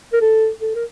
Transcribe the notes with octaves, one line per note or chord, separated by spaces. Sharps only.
A#4
A4
A4
A#4